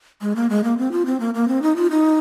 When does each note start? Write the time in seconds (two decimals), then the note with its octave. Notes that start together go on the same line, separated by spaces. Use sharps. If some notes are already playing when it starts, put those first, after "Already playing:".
0.22 G#3
0.36 A#3
0.50 G#3
0.64 A#3
0.78 C4
0.92 F4
1.06 C4
1.20 A#3
1.34 A#3
1.48 C4
1.62 D#4
1.76 F4
1.91 D#4